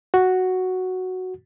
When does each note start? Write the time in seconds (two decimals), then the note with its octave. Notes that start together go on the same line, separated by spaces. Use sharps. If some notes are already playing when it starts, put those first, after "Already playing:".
0.14 F#4